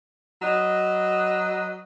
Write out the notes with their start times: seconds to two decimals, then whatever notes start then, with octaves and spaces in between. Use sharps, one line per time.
0.42 F#3 B4 D#5